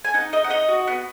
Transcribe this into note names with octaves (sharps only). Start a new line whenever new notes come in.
G#5
D#4 F#5
D#4 D#5
F#5
D#4 D#5
F#4
B3